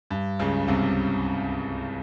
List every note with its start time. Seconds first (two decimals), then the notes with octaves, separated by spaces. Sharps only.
0.10 G2
0.39 C#2 C#3
0.68 C2 C3